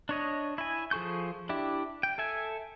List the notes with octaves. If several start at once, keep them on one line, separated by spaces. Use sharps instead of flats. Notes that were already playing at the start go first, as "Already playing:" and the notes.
D4 C#5 D#5
E4 G#5
F3 G#4 A4 C#6 G6
D4 E4 G4
G5
A4 E5 G#5